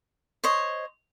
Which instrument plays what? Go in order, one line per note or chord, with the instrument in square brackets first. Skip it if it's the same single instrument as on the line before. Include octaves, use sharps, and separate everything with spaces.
[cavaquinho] C5 C#5 D#5